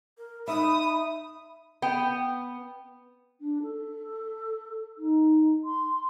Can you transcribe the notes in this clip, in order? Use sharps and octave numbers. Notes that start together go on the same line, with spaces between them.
A#4
D#4 E5 B5 D#6
B3 G5
D4
A4
D#4
C6